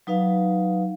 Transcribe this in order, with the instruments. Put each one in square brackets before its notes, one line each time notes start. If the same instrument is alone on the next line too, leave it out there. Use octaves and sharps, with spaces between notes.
[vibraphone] F#3 D#4 B4 F5